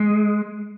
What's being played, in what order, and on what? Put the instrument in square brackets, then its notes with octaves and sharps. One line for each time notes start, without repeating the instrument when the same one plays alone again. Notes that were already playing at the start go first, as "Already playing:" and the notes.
Already playing: [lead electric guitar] G#3